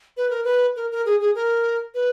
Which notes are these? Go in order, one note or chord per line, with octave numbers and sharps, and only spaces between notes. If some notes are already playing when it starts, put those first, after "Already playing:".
B4
A#4
B4
A#4
A#4
G#4
G#4
A#4
B4